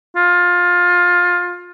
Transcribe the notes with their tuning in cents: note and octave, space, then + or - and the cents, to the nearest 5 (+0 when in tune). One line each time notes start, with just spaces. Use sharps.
F4 +20